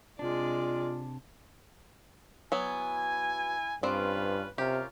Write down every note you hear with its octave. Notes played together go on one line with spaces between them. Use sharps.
C3 G#3 D4 F4 D5
F#3 B3 E4 G#5
G2 C4 C#4 F4 B4 D5
C3 C#4 F4 G4 A#4